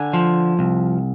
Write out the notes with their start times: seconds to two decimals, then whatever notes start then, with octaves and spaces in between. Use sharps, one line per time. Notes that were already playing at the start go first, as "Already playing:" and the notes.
Already playing: D3 G#5
0.13 F3
0.59 C2